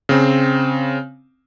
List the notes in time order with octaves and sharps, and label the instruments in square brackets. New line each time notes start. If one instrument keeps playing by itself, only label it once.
[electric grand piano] C#3 C4